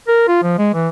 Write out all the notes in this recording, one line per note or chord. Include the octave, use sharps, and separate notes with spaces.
A#4
F4
F3
G#3
E3